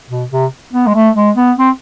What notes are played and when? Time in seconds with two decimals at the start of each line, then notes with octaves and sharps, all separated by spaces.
0.09 B2
0.30 C3
0.73 B3
0.87 G#3
0.94 A3
1.15 G#3
1.36 B3
1.58 C4